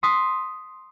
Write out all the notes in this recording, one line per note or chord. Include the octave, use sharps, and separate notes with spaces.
C6 D#6 B6